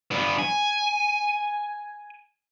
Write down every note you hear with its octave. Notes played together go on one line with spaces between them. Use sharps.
G2 B3
G#5